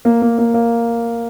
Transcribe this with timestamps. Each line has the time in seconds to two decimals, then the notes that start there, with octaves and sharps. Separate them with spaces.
0.05 A#3
0.22 A#3
0.38 A#3
0.54 A#3